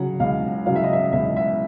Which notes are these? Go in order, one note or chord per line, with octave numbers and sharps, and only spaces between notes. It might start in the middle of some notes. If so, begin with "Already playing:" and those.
Already playing: C#3 F#3 F#5
C#2 F5
C#3 F#3 F5
E5
D#5
E5
C#2 E5
E5